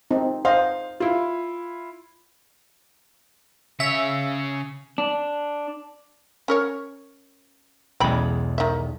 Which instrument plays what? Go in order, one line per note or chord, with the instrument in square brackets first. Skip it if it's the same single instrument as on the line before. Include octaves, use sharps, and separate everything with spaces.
[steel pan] C4 D#4
[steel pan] C5 D#5 [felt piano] F5
[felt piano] E4 F4
[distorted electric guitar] C#3 C#5 [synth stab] E5
[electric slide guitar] D4
[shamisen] C#4 A#4 C#5
[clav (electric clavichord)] B1 E2 G#3 [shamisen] C#3 G5 B5
[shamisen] D#3 E5